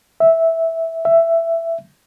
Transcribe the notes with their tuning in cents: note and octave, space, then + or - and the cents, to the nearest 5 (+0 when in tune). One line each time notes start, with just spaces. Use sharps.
E5 -10
E5 +10